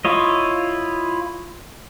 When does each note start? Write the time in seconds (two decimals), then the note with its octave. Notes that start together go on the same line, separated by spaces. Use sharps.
0.05 E4 F4 C#5 D#5